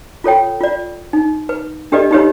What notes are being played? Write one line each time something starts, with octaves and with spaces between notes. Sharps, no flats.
F4 A4 C#5 G5
F4 D5
D#4
B4
D4 G4 A4 B4 D5 D#5
D#4 F4 G4 B4 C#5 D#5